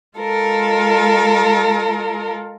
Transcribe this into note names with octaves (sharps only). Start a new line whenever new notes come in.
G#3 F4 A4 A#4